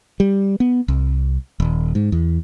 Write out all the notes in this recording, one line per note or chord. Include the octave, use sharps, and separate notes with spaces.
G3
B3
C2
D#1
G#2
E2